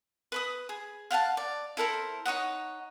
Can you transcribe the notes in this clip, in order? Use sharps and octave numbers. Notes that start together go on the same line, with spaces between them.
B4 B5 D#6
G#4
F5 F#5 G#5 A5
D5
E4 A4 A#4 C5
D#4 C#5 D#5 F#5